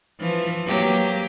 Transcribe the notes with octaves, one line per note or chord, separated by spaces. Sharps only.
E3 F3
F#3 A#3 G4